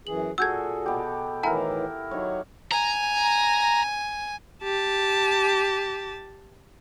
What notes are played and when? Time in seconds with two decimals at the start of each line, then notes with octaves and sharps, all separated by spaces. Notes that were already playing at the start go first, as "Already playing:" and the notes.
0.07 F#2 E3 G#4 F#7
0.38 A#2 F#4 G#4 A4 E6 G6 G#6
0.86 B2 G4
1.43 A2 D#3 E3 E4 A#4 F#5 G#5 A#5
2.11 D#3 F#3 C#5
2.71 G#5 A#5
4.63 G4 A5